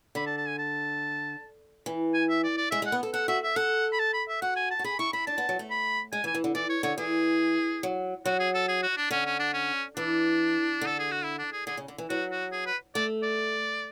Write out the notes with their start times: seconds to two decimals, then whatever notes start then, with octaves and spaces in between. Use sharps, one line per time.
0.15 D3 B5
0.26 A5
0.37 A5
0.47 G#5
0.58 A5
1.86 E3
2.14 G#5
2.29 E5
2.44 D5
2.57 D5
2.71 G#3 E5
2.82 G#3
2.86 F#5
2.92 B3
3.03 A4
3.14 A4 F#5
3.28 F#4 E5
3.43 E5
3.56 A4 F#5
3.93 B5
3.99 A5
4.14 B5
4.28 E5
4.42 F#4 F#5
4.56 G#5
4.71 A5
4.79 F#4
4.84 G#4 B5
4.99 E4 C#6
5.13 E4 B5
5.27 D4 A5
5.38 B3
5.49 F#3
5.59 A3
5.71 B5
6.12 G#3 G#5
6.24 E3
6.27 G#5
6.35 E3
6.44 D3
6.55 E3 D5
6.69 C#5
6.83 D3 C#5
6.98 E3 G#4
7.83 F#3
8.26 F#3 F#4
8.40 G#4
8.54 A4
8.68 G#4
8.83 F#4
8.97 D4
9.11 D3 C#4
9.26 C#4
9.39 D4
9.54 C#4
9.97 E3 D4
10.81 D3 A4
10.99 G#4
11.11 F#4
11.24 E4
11.39 D4
11.52 G#4
11.67 D3 G#4
11.77 C#3
11.88 D3
11.98 E3
12.10 F#3 F#4
12.31 F#4
12.52 G#4
12.66 B4
12.95 A3 D5
13.23 D5